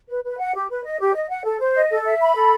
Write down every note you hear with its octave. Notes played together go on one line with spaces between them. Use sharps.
B4
B4
F#5
G4
B4
D#5
G4
D#5
F#5
A4
C5
D#5
A4
E5
B5
A4